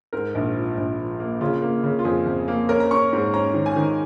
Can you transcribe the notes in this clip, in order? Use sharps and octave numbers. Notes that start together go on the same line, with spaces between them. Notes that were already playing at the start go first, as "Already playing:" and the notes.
G#2 A#4
A#1
F3
A#1
F3
A#3
C#3 F4
A#3
C#3
F4
F2 G#4
F2
A#3
C#4 A#4
A#5
C#4 C#6
G#2
C#4 A#5
D#3
G#5
D#3